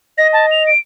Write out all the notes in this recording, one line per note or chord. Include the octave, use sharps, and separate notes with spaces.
D#5 A#6
A5
F7
D7